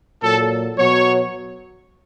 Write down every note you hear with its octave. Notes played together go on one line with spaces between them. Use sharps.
A#2 F#3 A4
B2 F#3 C#5